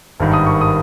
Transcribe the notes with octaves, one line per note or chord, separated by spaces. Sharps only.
G#1 G2 D#3
D#6
C#6
D#6